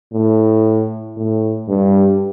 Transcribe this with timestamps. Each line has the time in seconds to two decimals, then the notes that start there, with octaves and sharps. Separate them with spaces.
0.12 A2
1.17 A2
1.68 G2